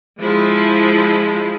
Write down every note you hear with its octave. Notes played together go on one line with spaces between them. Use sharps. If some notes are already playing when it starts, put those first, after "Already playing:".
F3 G#3 E4